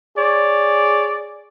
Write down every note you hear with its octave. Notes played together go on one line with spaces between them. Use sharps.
G#4 C#5 D5